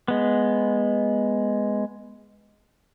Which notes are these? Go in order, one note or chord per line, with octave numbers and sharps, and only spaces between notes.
G#3 B3